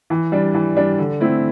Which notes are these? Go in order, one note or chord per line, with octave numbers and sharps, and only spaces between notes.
E3
G3 D4
E3
G3 D4
D3
A3 C4 E4